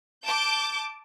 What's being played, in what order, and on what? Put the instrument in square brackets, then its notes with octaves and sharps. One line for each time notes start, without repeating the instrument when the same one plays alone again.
[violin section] A5 D6 G6